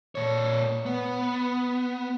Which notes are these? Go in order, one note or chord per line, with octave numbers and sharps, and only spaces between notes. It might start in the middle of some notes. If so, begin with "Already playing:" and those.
A#2 C#5
B3